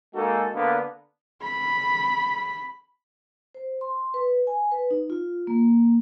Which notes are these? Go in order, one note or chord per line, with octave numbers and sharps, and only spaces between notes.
G#3 A#3 D#4 F#4 A4
D3 A#3 B3
B5
C5
C6
B4
G#5
B4
D#4
F4
A#3